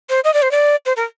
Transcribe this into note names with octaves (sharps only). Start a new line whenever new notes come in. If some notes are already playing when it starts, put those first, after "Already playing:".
C5
D#5
D5
C5
D5
C5
A#4